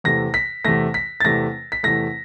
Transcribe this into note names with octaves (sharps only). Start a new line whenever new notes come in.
E2 C3 E3 A3 A#6
B6
E2 C3 E3 A3 A#6
B6
A6
E2 C3 E3 A3 A#6
B6
E2 C3 E3 A3 A#6